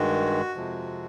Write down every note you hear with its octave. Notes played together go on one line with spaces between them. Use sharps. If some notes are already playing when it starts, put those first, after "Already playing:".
Already playing: G2 D#3 G#3 F#4
F2 C3 F3 G#3